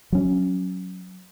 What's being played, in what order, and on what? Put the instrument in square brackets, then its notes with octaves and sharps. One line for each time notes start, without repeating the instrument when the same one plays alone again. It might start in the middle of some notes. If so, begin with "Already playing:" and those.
[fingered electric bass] F#3 C#4